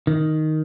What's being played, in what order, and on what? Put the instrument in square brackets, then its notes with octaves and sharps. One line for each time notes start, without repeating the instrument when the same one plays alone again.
[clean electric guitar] D#3